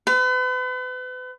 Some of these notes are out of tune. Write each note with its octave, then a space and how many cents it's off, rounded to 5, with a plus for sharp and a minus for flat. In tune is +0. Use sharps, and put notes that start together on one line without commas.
B4 +40